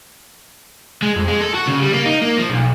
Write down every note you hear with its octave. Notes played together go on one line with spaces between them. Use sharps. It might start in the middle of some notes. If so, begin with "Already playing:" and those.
G#3
F2
G#3
A4
F#4
C#3
G3
A#3
D#4
A#3
F3
B1